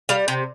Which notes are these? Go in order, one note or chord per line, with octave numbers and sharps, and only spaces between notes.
G3 F5
C3 G5